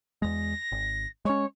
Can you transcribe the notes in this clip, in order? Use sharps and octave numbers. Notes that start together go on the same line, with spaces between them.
E2 G#3 A#6
G#1
G#3 C#4 C#5